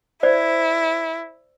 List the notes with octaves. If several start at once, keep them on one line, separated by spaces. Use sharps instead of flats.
E4 C5 D5